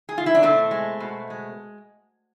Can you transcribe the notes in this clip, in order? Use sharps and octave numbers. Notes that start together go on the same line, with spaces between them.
G#4
F4
E4
D4
B2 A3 C4
G#3
B2
G#3